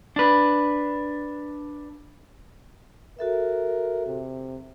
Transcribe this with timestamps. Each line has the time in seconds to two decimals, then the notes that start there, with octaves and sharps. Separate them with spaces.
0.16 D4 B4
3.19 F#4 A4 A#4 E5
4.06 C3